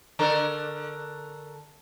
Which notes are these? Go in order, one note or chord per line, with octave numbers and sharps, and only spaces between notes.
D3 A4 A#4